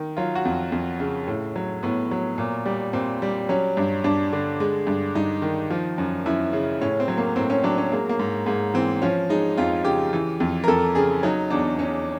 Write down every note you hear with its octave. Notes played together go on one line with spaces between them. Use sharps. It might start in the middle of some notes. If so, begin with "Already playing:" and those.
Already playing: D#3
F#3 F4
F#4
F2
F2
C#3
A2
F#3
A2 B3
F#3
A#2
G3
A#2 C4
G3
F#3 C#4
G2
G2 D4
D3
G#3
G2
G2 D#4
D#3
F3
F#2
F#2 E4
C#3
A2 C#4
C4
F#3
A#3
A2 C4
C#4
F#3 D4
C#4
G#3 A#3
A#3
G#2
G#2 A#3
E3 C4
F3 C#4
G#3 D#4
F2 F4
C#3 G4
E3
F2
A#4
F2 A4
C#3 G#4
F#3 D#4
E2 D4
E2 C#4